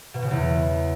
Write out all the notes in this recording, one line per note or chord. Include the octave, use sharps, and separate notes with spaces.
B2
C#3
E2